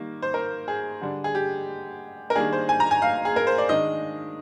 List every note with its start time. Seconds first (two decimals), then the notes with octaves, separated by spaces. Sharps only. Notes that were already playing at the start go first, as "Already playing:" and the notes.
Already playing: D#3 G3 A#3
0.22 C5
0.34 A#4
0.68 G#4
1.02 D3 G3 D4
1.24 G#4
1.35 G4
2.30 A#4
2.35 D#3 G3 A#3 D4 G#4
2.53 C5
2.69 G#5
2.80 A#5
2.91 G#5
3.02 F5
3.25 G#4
3.36 A#4
3.47 C5
3.58 D5
3.69 D#3 G#3 D4 D#5